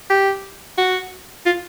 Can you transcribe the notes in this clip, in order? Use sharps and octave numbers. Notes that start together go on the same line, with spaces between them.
G4
F#4
F4